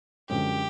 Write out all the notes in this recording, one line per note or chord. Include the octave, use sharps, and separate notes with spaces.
F#2 D3 F3 G#3 C#4 G4